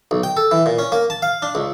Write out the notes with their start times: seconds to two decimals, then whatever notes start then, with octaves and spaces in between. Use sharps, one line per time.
0.11 B1
0.23 G5
0.37 A4
0.51 E3
0.66 A#2
0.79 C#4
0.92 A#3
1.10 A5
1.22 F5
1.42 D4
1.55 C#2